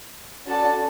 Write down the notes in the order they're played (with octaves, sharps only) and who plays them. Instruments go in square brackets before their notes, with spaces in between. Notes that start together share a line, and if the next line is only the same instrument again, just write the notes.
[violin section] C#4 F#4 A4 D5 A5